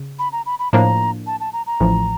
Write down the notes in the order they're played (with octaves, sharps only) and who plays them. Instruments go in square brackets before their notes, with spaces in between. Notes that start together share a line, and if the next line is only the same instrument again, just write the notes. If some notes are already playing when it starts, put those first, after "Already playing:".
Already playing: [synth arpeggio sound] C#3
[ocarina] B5
A#5
B5
B5
[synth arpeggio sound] A2 F3 A#3 D4 [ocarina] A#5
[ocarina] A5
A5
A#5
A#5
[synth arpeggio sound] A1 A2 F3